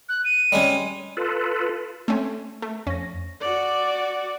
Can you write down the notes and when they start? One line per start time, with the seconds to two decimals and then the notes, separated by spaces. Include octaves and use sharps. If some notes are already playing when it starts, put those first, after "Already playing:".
0.09 F#6
0.24 D#7
0.52 G3 G#3 C#4
1.17 F4 A4 B4
2.08 A3 C4 C#4
2.62 A3
2.87 F2 C#4 A#6
3.41 F#4 D5